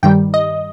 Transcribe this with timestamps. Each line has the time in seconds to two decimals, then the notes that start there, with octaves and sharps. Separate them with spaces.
0.03 G2 D#3 G3 G5
0.34 D#5